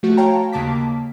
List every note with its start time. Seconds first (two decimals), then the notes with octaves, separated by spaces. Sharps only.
0.03 F3 A3 F#4
0.17 C#5 F5 G5 A5 A#5
0.52 D#2 C#3 A#3 A5 D6 B6